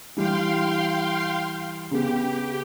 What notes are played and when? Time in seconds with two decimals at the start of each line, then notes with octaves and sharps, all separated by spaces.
0.17 E3 G3 F5 G5 C6
1.91 C#3 B3 G4